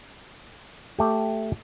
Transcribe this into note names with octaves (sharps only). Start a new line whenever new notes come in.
A3 G4